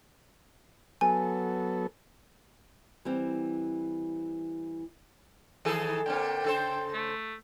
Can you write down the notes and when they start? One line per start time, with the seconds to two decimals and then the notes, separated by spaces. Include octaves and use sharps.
1.01 F#3 B3 A4 G#5
3.05 E3 G3 C4
5.65 D#3 G#4 A4 G#5
6.06 D3 A#3 C4 G5
6.44 C#3 A4 C5
6.94 A3